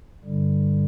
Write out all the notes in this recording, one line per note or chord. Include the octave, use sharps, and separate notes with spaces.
G2 D3 G3